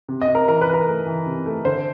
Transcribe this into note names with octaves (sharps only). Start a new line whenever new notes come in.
C3
D#5
C3
A#4
E3 A#4
B4
E3
A#4
A3
E3
C3
A3
D3 C5